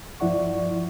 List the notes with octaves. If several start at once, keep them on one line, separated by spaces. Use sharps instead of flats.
G2 F3 E4 D5 F#5 C#6